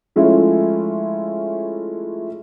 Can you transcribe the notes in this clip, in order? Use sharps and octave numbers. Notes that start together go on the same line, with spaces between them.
F3 G#3 A3 C#4 E4 F4